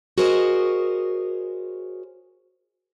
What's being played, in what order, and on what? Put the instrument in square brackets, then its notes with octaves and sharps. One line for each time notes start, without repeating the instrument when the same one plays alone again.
[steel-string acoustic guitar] F#4 G#4 A#4 C5 C#5 D#5